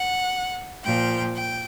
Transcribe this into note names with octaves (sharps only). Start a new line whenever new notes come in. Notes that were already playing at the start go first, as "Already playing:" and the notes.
Already playing: F#5
A#2 F3 G5
G5